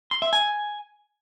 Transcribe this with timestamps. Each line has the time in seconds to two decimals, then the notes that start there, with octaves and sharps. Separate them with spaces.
0.11 C6
0.22 E5
0.33 G#5